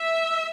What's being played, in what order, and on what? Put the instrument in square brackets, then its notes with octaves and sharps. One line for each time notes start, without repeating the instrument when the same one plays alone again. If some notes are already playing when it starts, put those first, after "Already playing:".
Already playing: [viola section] E5